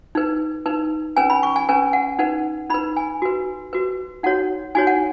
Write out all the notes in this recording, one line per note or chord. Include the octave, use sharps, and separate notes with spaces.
D#4 B4
D#4 B4
C#4 B4 G#5
B5
C#6
G#5
C#4 B4 G#5
F#5
D#4 B4 F#5
D#4 B4 B5
G#5
F#4 B4
F#4 B4
D#4 F#4 C#5 F#5
D#4 F#4 C#5 G#5
F#5